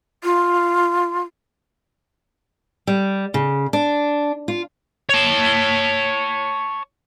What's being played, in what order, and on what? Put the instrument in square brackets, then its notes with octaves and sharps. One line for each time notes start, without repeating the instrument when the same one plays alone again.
[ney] F4
[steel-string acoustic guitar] G3
C#3
D4
F4
[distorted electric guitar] C#5 A5